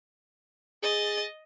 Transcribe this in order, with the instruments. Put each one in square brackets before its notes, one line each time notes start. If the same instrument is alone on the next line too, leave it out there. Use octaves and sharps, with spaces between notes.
[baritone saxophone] G#4 [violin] D#5 A6